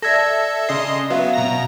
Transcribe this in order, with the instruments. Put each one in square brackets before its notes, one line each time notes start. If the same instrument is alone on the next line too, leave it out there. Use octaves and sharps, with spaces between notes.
[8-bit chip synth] A4 E5 [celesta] D5 G#6 A#6
[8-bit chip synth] C#3 D#5 C6
[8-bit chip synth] F#3 B3 [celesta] E5 F5
[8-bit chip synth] B2 A#5 A#6